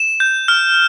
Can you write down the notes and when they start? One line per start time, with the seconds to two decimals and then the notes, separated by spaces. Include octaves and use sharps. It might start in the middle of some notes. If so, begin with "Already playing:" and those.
Already playing: E7
0.20 G6
0.48 F6